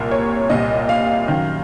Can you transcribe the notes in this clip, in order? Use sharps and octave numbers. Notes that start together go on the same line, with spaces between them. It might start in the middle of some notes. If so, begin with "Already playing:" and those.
Already playing: C2 A#2 A#4
C#5
C2 A#2 D#5
F5
F#2 D#3